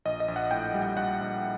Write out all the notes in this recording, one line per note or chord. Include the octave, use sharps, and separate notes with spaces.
A#1 D#5
D#5
A#1
F#5
A2 G5
G3
G5
A#1 F#5
A#1